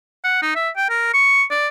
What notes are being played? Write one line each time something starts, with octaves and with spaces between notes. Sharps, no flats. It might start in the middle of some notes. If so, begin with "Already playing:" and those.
F#5
D#4
E5
G5
A#4
C#6
D5